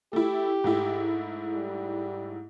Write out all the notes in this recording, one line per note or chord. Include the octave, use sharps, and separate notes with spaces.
A3 E4 G4
G#2 A3 E4
G3